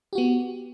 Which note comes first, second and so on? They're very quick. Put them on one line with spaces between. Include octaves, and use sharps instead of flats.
G4 F#4 B3